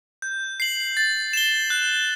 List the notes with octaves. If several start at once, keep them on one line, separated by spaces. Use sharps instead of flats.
G6
C7 F#7
A6
E7 G7
F#6